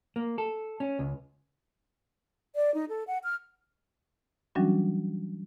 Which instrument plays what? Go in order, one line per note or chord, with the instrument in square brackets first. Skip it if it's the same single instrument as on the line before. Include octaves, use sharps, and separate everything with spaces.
[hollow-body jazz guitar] A#3
A4
C#4
C#2
[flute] D5
D#4
A4
F#5
F6
[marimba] E3 F#3 G3 C#4 D4 F#4